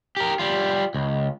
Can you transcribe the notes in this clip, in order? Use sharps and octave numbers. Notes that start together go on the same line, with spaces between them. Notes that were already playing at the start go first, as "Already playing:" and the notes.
G4 A#4
G3 F4
C#2